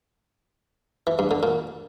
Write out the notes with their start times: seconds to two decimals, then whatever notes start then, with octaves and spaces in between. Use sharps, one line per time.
1.07 E3
1.19 G2
1.31 D3
1.43 A#2